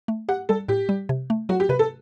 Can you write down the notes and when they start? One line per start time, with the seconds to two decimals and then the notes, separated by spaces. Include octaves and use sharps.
0.08 A3
0.29 G4 F#5
0.49 G3 A4
0.68 A2 G4
0.89 G3
1.09 C3
1.30 A3
1.49 F#3 F#4
1.60 G4
1.69 C3 B4
1.79 A4